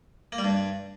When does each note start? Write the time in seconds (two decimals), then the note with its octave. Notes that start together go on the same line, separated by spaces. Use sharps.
0.32 A#3
0.38 G3
0.44 G2